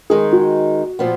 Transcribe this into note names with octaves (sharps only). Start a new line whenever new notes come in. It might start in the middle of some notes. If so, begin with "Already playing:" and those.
D#3 G#3 D#4 G#4
F#4
A#2 F3 B3